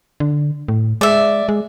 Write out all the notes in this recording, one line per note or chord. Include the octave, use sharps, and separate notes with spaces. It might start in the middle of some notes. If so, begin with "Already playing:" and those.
D3
A2
G#3 D5 E5
G#3